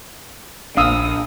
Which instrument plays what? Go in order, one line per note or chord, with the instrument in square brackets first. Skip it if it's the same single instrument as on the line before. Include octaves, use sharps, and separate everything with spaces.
[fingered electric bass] A#1 D4 [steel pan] F5 D#6 E6